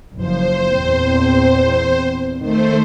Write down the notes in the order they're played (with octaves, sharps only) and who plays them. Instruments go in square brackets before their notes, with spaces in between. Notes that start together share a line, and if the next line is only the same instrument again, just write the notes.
[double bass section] F#1 F3 [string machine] C5
[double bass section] E2 A#2 C4
[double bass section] D#3 [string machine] A3 C5